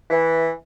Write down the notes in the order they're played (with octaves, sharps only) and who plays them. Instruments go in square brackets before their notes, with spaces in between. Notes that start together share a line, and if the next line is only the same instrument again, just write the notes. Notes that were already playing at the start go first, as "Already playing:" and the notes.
[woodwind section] E3